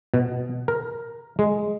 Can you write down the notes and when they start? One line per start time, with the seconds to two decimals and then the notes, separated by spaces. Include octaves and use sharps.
0.14 B2
0.68 A#4
1.39 G#3